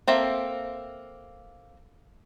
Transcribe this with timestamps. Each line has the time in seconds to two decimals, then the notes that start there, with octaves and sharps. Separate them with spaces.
0.08 A#3 C4 A4 E5